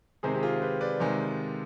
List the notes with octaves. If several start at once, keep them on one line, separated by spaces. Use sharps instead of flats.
C3 D#3 G#3 G#4 C5
G4
F4 G#4
G4 B4
B4 D5
C3 D#3 G#3